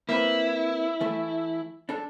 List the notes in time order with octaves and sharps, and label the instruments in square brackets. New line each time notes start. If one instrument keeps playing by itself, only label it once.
[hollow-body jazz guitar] A#3 C4 B4 [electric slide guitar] E4
[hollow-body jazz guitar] E3 A3
D4 A4